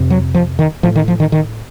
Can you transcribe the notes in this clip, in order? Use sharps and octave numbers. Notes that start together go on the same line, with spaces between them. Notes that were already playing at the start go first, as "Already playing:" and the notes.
Already playing: F2 C3
F#3
F3
D#3
A2 F3
D#3
F3
D#3
D#3